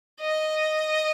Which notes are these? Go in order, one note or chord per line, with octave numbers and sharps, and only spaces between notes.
D#5